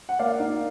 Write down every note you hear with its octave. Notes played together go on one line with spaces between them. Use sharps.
F#5
A#3 D5 F5
D#4